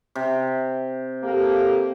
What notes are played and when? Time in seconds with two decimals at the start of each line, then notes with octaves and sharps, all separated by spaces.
0.15 C3
1.23 A#3 G4 A4